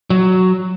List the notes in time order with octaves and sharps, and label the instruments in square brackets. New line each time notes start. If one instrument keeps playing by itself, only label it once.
[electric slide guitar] F#3